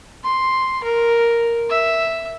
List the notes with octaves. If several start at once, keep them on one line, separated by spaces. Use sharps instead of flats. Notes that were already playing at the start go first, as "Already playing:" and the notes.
C6
A#4
E5